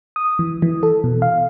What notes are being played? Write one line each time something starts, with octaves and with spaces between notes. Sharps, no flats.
D#6
E3
E3
A4
B2
F5